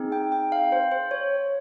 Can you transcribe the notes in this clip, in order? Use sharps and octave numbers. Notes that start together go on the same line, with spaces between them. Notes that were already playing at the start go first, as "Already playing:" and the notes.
Already playing: C4 D#4 G#4
G5
G5
F5
C5
C5
C#5